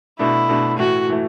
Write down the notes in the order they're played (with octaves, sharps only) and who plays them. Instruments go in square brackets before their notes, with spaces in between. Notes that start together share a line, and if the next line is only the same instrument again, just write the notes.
[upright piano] B2 A3 D4 [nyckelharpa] E4
[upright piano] B2 A3 D4
[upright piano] A2 E3 A3 [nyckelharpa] F#4
[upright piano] A2 E3 A3